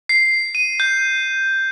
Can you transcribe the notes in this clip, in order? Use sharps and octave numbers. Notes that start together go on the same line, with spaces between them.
C7
D#7
G6